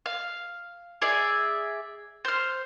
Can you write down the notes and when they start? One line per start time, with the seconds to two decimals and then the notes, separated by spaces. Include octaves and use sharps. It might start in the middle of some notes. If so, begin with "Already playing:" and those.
0.06 F5
1.02 G#4 D5 E5
2.25 C5 F6